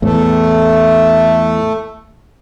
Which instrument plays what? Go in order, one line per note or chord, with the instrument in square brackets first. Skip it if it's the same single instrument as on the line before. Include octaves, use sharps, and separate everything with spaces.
[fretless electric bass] E2 A2 [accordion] A3